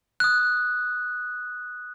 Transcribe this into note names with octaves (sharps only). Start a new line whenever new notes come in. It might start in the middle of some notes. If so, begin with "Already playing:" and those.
D#6 F#6